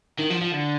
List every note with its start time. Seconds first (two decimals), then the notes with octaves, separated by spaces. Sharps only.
0.19 D#3
0.30 F3
0.41 F3
0.52 D3